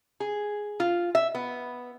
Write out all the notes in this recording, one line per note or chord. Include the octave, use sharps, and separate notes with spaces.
G#4
F4
E5
B3